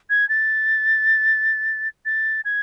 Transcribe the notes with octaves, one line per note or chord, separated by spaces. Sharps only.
G#6
A6
A6
G#6